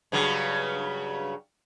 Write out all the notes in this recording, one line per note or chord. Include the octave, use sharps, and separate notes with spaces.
G2 C#3 F#3